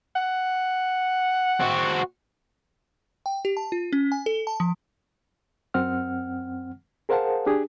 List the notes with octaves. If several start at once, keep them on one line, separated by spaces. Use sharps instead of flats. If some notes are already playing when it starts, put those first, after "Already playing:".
F#5
C4 F#4
G5
G4
A5
F4
C#4
G#5
A4
A5
F3
F#2 C4 F#5 F6
G#4 A#4 C5 F5 F#5 A5
D4 G4 G#4